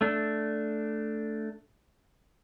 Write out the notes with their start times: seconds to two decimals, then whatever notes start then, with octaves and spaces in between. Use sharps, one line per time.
0.01 A3 D4